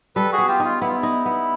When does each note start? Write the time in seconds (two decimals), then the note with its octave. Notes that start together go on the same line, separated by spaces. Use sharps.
0.16 G3 A4 B4
0.32 F#4 G#4
0.38 B3
0.48 F4 G4
0.60 D#4
0.65 F4
0.81 B3 E4
0.89 F4
0.96 E4
1.03 D#4
1.26 B3